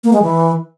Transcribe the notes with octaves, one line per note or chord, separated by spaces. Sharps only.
A#3
G#3
E3